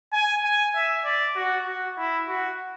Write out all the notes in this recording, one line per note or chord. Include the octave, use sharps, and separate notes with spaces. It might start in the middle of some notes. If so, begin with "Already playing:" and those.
G#5
G#5
E5
D5
F#4
F#4
E4
F#4